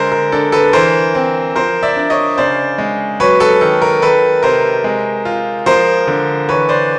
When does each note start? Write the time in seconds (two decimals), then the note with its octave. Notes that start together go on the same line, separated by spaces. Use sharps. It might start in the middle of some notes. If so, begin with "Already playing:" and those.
Already playing: D3 G#3 A#4 C5
0.12 A#4
0.32 D4 A4
0.52 A4 B4
0.73 E3 A#4 C5
1.15 C4
1.56 F3 A#4 C5
1.83 D5 E5
1.97 D4
2.10 C#5 D#5
2.38 C#3 C5 D5
2.78 G#3
3.20 F#3 B4 C#5
3.40 A4 B4
3.61 D#3 A4
3.82 A#4
4.02 D#3 A4 B4
4.43 C3 A#4 C5
4.84 G#3
5.25 F4
5.66 F3 A#4 C5
6.07 D3
6.49 E3 B4 C#5
6.69 C5 D5